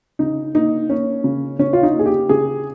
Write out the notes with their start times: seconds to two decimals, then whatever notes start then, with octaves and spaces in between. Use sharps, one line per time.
0.19 C#3 D#4
0.54 A#3 D#4
0.90 A#3 C#4
1.24 C#3
1.59 C#3 C#4
1.73 F4
1.83 D#4
1.94 A#3
1.99 G#4
2.06 G4
2.29 C#3 G#4